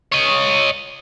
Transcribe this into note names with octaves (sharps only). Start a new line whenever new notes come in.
C#5 D#5